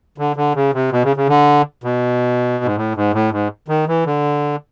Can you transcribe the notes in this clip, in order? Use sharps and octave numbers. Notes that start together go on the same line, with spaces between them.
D3
D3
C#3
C3
B2
C#3
C#3
D3
B2
G#2
A2
G#2
A2
G#2
D#3
E3
D3